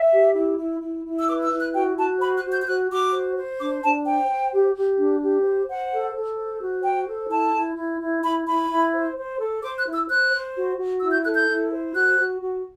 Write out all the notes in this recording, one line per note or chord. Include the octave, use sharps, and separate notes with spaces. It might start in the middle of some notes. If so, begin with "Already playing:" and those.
Already playing: E5
G4
E4
E4
E4
E4
E6
B4 D6
E6
E4
F#6
F#4 G5
F#4 A5
C5 B5
F#6
F#4
G6
G6
F#4 F#6
F#4 D6
C5
C5
D4 D6
D4 A5
C5 G5
C5
G4
G4
D4
G4
C5
C5 F#5
A4
A4
C5
F#4
C5 G5
A4
E4 A5
E4
E4
E4
E4 B5
E4 B5
E4
C5
C5
A4
C5 D6
F#6
E4
E6
C5 F#6
C5
F#4
F#4
E4 E6
G6
A4 F#6
G6
E4
C5
F#4 F#6
F#4
F#4